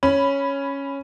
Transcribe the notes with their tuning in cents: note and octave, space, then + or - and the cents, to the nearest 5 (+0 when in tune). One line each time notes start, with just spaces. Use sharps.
C#4 +0 B5 +0